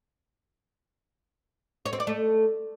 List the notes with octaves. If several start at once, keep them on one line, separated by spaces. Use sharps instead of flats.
C#5
C4
D5
A3